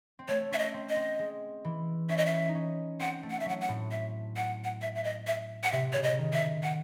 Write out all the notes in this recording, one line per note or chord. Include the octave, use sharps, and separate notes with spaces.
C4
A3 C#5
C#4 E5
D#5
C4
D#5
C4
G#3
E3
C#4 E5
D#5
E5
D#4
C#4
C4 F#5
A3
F#5
E5
F#3 F#5
F#5
A2
E5
F#5
F#5
E5
E5
D#5
E5
F#5
C3 E5
C#3 C#5
D#5
D#3
E5
F#5